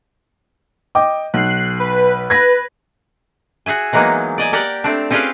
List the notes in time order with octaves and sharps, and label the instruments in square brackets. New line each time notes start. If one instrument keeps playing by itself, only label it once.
[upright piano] D#5 G5 D6
[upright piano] B1 [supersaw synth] F#6 C7
[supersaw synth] B4
[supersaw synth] B4 [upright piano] G#6 A#6
[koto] F#4 G#4 E5 G#5
E3 F#3 G#3 A#3 B3 D#4
D5 D#5 G#5
G4 A#4 D5 F#5
A3 C4 D4
C4 C#4 F4 G4 G#4 B4